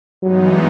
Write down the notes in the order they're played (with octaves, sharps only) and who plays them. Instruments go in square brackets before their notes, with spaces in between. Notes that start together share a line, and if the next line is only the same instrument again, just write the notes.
[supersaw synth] G2 E3 G#3 B3 D#4 [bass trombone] F#3